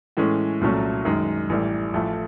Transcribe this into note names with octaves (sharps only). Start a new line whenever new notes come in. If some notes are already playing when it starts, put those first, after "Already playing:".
A2 E3 G#3 C#4
C2 A#2 F#3 A3 C#4
F#2 D#3 G#3
A1 A2 E3 G3
A1 A2 F3 A3